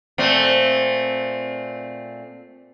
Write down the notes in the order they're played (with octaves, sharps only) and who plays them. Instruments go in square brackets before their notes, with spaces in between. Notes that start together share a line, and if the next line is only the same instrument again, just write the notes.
[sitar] A#2 A3 C4